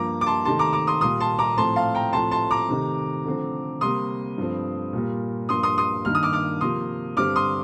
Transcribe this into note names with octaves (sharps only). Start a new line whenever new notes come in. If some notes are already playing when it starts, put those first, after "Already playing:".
Already playing: G2 F3 A#3 A#5 D6
D6
A5 C6
C3 D#3 A3 A5 C6
A#5 D6
A#5 D6
C6 D#6
A#2 G3 A#3 C6 D#6
A5 C6
A#5 D6
A2 F3 A3 C4 A5 C6
F5 A5
G5 A#5
A2 F3 A3 C4 A5 C6
A5 C6
A#5 D6
C3 D#3 A3
D3 F3 A3 C4
C3 G3 A#3 C6 D#6
G2 F3 A3 C4
A#2 G3 A#3
G2 F3 A#3 C6 D#6
C6 D#6
C6 D#6
G2 D#3 A#3 F6
D#6
D6 F6
D6 F6
C3 F3 A#3 C6 D#6
G2 D3 G3 C4 D6 F6
C6 D#6